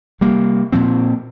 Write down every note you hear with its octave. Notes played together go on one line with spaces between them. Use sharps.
C3 G3 A#3
A#2 F3 C4